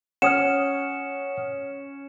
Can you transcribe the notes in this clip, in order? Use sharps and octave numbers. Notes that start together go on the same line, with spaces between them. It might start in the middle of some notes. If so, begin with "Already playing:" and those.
C#4 F#5 D#6 F6 C#7 E7